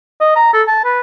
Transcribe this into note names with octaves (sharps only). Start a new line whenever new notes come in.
D#5
A#5
A4
A5
B4